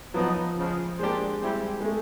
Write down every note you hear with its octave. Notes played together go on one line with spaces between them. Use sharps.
F3 F#3 B3 D#4
C#3 F3 G#3
G#3 A#3 D4 G4 C5
G3 C4 E4 G4
G#3
A3